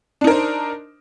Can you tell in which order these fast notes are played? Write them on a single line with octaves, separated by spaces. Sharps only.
D4 D#4 A#4 C5